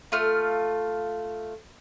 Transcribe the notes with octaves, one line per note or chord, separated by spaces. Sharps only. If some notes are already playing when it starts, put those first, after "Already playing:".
A3 F4 F6